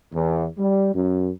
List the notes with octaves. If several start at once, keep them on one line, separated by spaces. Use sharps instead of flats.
E2
G3
F#2